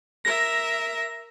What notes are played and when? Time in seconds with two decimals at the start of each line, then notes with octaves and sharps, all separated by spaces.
0.25 A#4 E5 A#6